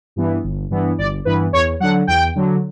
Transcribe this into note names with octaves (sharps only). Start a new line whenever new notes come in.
G2 E3 B3
G1
G2 E3 B3
G1 D5
G2 E3 B3 B4
E2 C#5
D3 F#3 F#5
E2 G5
D3 F#3